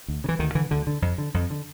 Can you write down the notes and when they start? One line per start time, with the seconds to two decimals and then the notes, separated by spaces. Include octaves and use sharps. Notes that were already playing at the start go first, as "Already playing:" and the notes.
0.08 D2
0.24 C#3
0.29 E3
0.39 D2 D#3
0.55 D3 E3
0.71 D2 D3
0.87 D3
1.02 F2
1.18 D3
1.34 F2
1.50 D3